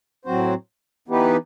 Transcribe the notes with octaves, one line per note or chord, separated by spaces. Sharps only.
A2 F#3 C4 F#4 C5
E3 B3 D#4 G4 B4